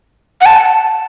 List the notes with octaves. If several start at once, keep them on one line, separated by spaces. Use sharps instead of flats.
F#5
A5